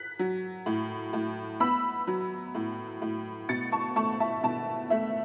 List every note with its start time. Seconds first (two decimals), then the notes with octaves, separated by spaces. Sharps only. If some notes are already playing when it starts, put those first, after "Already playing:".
Already playing: F#6 B6
0.19 F#3
0.66 A2
1.13 A2
1.60 B3 B5 E6
2.07 F#3
2.55 A2
3.02 A2
3.49 B2 A6 C#7
3.72 A5 C#6
3.96 A3 A5 C#6
4.20 E5 A5
4.43 B2 E5 A5
4.90 A3 E5